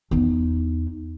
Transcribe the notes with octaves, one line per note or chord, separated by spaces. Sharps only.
E2 D#4